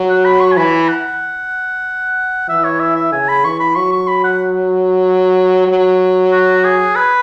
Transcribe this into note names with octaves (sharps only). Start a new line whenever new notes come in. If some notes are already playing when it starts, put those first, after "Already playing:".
Already playing: F#3
F#5
B5
C#6
G#5
E3 B5
F#5
E3 E5
C#5
E5
E5
C#3 G#5
B5
E3 C#6
B5
F#3 C#6
C#6
B5
F#5
F#3
F#4
G#4
B4